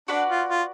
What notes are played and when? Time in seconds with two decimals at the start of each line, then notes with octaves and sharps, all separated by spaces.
0.08 D4 F#4 B4 D5
0.29 F4
0.49 F4